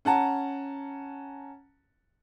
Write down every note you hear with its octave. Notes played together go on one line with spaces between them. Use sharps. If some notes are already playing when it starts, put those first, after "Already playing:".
C#4 F#5 A5 A#5